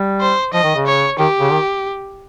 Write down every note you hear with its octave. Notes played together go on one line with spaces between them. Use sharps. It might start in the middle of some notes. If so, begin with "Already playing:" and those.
Already playing: G3
C5
F3 D#5
D#3
C#3
C#5
D#3 G4
C#3
D#3